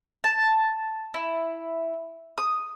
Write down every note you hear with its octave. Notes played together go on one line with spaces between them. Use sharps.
A5
E4
D#6